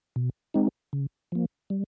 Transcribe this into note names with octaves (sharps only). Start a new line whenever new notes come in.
B2
G#3 C4 D#4
C#3
F3 A#3
G3